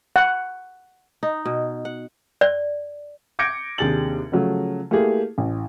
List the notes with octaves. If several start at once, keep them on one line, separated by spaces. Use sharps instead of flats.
F#5
D#4
B2
F#5
D5
D6 G6 G#6 A#6 C#7 D7
D#2 C3 D4 G#4 A6 F#7
C#3 F3 F#3 A3
A3 A#3 E4 G4 G#4
A1